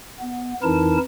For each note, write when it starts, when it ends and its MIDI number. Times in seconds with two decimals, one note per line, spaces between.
0.20 0.54 59
0.63 0.97 41
0.63 0.97 52
0.63 0.97 63
0.63 0.97 64
0.63 0.97 70
0.63 0.97 81